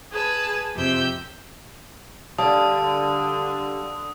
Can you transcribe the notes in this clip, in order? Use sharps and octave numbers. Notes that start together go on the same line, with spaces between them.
G#4 B4 A5
F2 C3 G4 E6 G6
D3 G3 D5 F5 A5 D#6